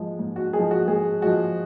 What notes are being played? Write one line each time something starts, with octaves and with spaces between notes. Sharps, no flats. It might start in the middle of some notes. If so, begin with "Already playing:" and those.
Already playing: G#2 F3 G#3
G#2
F#4
F3 G#3 G#4
F#4
G#2 G#4
F3 G#3 F#4